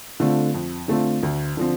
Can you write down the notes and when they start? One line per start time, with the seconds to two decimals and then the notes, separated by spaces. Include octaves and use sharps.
0.20 D3 A3 C4 F4
0.54 F2
0.88 D3 A3 C4 F4
1.23 D2
1.57 D3 F3 C4